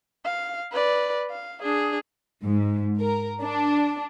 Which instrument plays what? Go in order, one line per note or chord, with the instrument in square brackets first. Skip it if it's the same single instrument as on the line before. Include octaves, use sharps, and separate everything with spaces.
[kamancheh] F5
B4 D5
F5
D4 G#4
[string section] G#2
A#4
D4